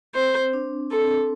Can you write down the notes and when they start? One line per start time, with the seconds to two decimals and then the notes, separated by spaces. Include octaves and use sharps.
0.15 C4 C5
0.53 D4
0.91 C4 A4